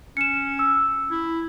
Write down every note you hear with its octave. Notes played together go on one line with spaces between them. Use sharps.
C#4 C#7 E7
E6
E4